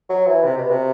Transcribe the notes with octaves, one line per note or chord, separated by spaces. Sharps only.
F#3
E3
C3
B2
C3